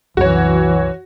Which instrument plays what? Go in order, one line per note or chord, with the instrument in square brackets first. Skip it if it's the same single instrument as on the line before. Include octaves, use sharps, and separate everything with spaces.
[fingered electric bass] C2 F#2 C3 [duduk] E3 [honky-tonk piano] F#4 C#5